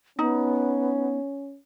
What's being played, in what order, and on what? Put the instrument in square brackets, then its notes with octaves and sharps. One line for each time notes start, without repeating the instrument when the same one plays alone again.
[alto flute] B3 [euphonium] C#4 [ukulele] D#4